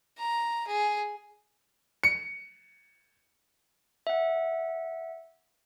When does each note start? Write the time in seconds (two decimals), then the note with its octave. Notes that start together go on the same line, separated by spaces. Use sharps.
0.19 A#5
0.68 G#4
2.03 C#7
4.07 E5 F#5